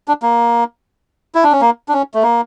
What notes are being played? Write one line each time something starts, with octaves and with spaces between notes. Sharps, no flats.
D4
A#3
E4
D4
C#4
A#3
D4
C#4
A3
A#3